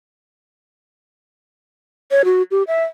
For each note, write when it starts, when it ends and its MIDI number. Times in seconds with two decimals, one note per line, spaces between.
2.11 2.22 73
2.25 2.42 66
2.51 2.63 67
2.67 2.84 76